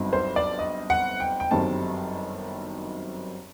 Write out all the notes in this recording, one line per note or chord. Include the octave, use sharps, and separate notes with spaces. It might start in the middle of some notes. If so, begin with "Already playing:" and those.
Already playing: G1 G2 F#3 C4 D#4
C5
D5
D#5
F#5
G5
G5
G1 F#2 D#3 G3 C4 A5